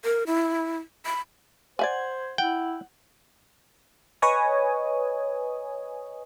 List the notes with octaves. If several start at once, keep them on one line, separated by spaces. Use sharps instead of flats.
A#4
E4
B5
C5 D5 E5 F#5 G#5 G#6
E4 F#5 G5
B4 C#5 D#5 G#5 D#6